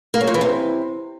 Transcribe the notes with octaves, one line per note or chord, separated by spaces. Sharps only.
A#3
F#3
A#2
E3
C3